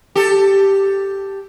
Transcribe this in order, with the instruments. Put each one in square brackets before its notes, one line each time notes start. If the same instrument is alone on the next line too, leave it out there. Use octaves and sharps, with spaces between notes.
[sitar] G4 A4